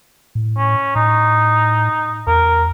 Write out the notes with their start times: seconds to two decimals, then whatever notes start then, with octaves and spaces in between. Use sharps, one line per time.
0.35 A2
0.57 C#4
0.95 A2 D#4
2.27 E2 A#4